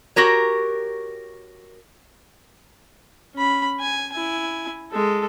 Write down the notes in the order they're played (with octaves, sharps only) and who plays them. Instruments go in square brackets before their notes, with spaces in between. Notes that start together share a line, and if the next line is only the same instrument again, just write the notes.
[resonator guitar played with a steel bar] F#4 G4 A#4 C#5
[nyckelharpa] C#4 B5
G#5
E4 G#5
G#3 A4